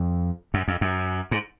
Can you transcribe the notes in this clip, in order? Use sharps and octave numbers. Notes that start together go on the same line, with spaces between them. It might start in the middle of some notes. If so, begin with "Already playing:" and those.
Already playing: F2
F#2
F2
F#2
G#2